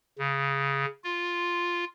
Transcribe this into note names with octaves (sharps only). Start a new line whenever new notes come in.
C#3
F4